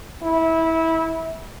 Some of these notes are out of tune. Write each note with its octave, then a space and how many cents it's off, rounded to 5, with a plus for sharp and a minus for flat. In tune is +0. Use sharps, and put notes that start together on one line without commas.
E4 -20